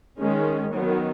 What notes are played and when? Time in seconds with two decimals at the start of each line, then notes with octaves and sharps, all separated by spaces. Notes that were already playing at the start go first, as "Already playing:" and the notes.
0.20 D#3 G#3 C#4
0.74 D#3 F#3 B3